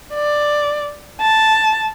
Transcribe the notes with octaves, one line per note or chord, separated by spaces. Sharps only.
D5
A5